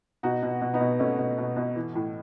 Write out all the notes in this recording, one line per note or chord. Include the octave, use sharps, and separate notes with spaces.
B2 D#4 F#4
B2
B2
B3 D#4
B2
B2 A3 C#4
B2
B2
B2
E3
A2